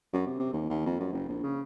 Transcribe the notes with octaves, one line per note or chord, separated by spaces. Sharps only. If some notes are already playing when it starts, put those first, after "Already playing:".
F#2
C3
C3
D#2
D#2
F2
F#2
F#1
A#1
C#3